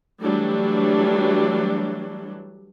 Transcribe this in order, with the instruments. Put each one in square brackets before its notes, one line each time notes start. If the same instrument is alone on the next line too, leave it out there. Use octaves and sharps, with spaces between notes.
[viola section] E3 F#3 G3 A3 D4